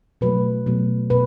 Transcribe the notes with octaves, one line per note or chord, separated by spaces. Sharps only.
B2 F#3 A3 B4
B2 F#3 A3
B2 B4